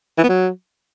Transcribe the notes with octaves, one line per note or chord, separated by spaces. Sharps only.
E3
B3
F#3